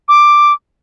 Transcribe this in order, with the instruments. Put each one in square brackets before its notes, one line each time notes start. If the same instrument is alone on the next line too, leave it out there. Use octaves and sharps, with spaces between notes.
[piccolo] D6